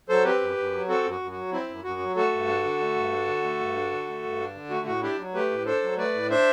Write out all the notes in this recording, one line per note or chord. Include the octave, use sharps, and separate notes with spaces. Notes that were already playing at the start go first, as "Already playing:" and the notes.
F#3 A4 C5
C4 G4 B4
F#2
F#2
F#3
C4 F#4 A4
F#2
F#4
F#2
F#3 F#4
C4 E4
F#2
F#2 F#4
F#3
A3 F#4 A4
G2
D4
D3
A3
G2
D4
D3
A3
G2
D4
D3
A3
G2
D4
D3
A3 F#4
A2 F#4
D4 E4 G4
F#3
A3 G4 B4
A2
D4 A4 C5
F#3
A3 B4 D5
A2
D4 C5 E5